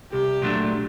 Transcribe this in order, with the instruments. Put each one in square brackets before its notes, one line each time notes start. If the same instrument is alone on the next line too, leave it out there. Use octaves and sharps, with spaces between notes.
[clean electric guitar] C2 [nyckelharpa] G4
[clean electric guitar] A#2 F#3 A3 D4